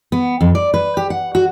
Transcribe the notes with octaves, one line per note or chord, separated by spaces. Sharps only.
B3
F2
D5
B4
G4
F#5
F#4